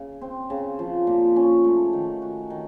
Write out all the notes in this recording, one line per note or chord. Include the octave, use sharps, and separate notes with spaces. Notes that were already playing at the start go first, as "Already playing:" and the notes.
Already playing: C#3
C4
C#3
F3
A#2
C#4
A3
D#3
F#4
D#3